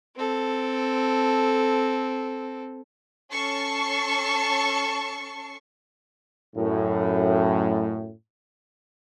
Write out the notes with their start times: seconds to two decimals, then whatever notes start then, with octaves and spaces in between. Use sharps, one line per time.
0.16 C4 A4
3.31 C#4 A4 A5 C#6 C7
6.56 F#2 A2